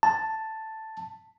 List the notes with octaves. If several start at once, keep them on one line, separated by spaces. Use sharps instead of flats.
A5